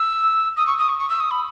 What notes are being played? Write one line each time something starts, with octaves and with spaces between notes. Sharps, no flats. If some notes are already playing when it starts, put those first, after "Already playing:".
Already playing: E6
D#6
C#6
D#6
C#6
C#6
E6
D#6
B5